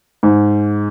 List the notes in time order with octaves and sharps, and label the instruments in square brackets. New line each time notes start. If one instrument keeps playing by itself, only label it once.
[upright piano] G#2